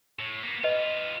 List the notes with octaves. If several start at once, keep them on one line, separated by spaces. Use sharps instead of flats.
A2
A#3 B3
B3 F4 B4 D#5